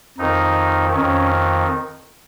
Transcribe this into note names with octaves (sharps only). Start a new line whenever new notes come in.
F2 D#3 D#4
F2 D#3 C#4